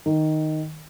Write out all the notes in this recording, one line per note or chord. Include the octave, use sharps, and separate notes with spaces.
D#3